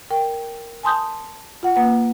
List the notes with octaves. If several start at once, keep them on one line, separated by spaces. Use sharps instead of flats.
A#4 G5
G#5 A5 C6 D#6 G6
F4 F#5
A#3 B4 F#5